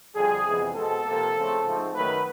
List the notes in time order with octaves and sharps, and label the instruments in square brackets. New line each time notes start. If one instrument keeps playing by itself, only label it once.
[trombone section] F2 D3 G3 G#4
F2 C3 E3 G#3 B3
B2 G#3 C4 A4
C3 F3 A#3
C#3 F3 A3 C4
G#2 F3 A3 C4
F#2 D#3 F#3 A3 B4